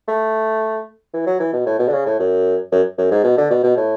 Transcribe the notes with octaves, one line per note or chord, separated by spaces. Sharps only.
A3
E3
F#3
E3
B2
A2
B2
D3
C#3
A2
F#2
F#2
F#2
G#2
B2
D3
B2
B2
A2